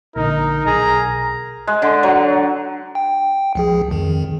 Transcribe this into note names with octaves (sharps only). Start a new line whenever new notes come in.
A#1 D3 D#4 A#4
B1 G#4 A#5
G#3
D3
F#3
G5
C#2 F3 G#4
F2 D#3